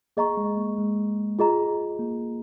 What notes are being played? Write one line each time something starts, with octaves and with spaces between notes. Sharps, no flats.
A#3 G#4 D#5 A#5 C#6
G#3
A#3
G#3
F4 G#4 D#5 A#5
A#3